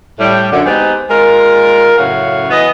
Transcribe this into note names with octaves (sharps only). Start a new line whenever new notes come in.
A2 G3
F#2 D3
G#3 B3 C4 D#4 G4
G#3 F4 A#4
F#2 A2 C#3 F#4 F5
E3 B3 D#5